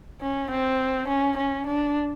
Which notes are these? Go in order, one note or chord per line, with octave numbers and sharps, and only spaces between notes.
C#4
C4
C#4
C#4
D4